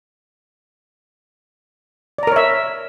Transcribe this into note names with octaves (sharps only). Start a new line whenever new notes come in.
A#4 C#5 D5 E5 A#5